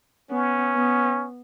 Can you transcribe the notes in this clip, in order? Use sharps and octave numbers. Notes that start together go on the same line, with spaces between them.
B3 C#4
B3